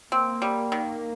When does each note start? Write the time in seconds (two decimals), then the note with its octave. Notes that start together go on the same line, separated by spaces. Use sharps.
0.12 A#3 C4
0.42 G3
0.72 D#3